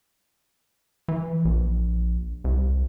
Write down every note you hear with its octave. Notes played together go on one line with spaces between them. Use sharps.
E3
A#1
C2